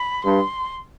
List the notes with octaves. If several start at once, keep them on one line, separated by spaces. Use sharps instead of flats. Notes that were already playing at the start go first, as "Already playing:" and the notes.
Already playing: B5
G2 C6